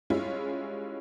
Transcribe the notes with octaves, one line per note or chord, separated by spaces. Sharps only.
G3 G#3 C#4 E4 F4